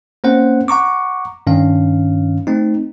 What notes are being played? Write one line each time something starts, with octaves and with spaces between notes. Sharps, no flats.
A#3 C4 C#4 C5 F#5
F#5 A#5 C#6 D6
G2 D#3 C#4 F5
A3 C4 D#4